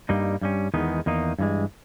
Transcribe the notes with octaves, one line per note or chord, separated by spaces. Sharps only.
G2 G3 A#3 D#4
G2 G3 C#4
E2 D#3 G#3 B3 D#4
E2 D#3 A#3 D#4
G2 E3 G#3